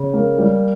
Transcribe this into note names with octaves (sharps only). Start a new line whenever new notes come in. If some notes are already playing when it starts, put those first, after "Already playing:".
Already playing: C#3
A#3
G3